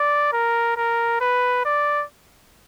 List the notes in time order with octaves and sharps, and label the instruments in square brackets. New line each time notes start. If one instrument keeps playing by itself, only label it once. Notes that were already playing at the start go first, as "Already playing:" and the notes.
Already playing: [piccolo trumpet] D5
A#4
A#4
B4
D5